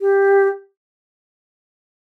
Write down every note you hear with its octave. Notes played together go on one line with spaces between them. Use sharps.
G4